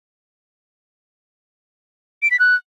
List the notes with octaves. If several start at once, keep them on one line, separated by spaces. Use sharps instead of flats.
D7
B6
F#6